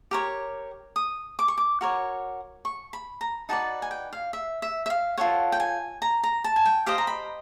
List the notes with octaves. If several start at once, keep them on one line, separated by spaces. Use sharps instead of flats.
G4 A#4 C#5
D#6
D6
C#6
D6
F#4 A#4 C#5
C#6
B5
A#5
D#4 F#4 B4 D5 A5
G#5
G5
F5
E5
E5
E5
F5
F4 A4 C#5 F#5
G5
G#5
A#5
A#5
A5
G#5
G5
G4 C5 D#5 F5
A#5
B5